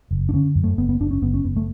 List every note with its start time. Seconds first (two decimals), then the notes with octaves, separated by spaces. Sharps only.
0.11 F#1
0.29 D4
0.33 D3 C#4
0.55 F#2
0.64 A3
0.78 F#1 B3
0.89 B3
1.00 F#1 D4
1.11 C#4
1.22 F#1 B3
1.34 C#4
1.44 F#1 B3
1.56 A3